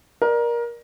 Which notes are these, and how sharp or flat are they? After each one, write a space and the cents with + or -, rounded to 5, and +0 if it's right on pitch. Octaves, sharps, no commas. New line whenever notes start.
A#4 +20 D5 +25